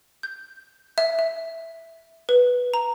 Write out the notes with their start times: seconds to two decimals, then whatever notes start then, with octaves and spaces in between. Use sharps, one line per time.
0.23 G6
0.98 E5
1.19 E5
2.29 B4
2.74 A#5